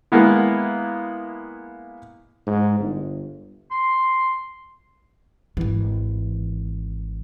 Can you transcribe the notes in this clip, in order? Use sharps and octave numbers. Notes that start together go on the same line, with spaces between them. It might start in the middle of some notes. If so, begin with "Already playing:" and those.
G#3 A#3 B3 E4
G#2
G1
C6
G#1 E3